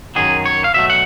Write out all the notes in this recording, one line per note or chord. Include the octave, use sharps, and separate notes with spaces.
F#2 D#3 F#3 G#4
C#5
F5
B2 F#3 A3 E5
F#5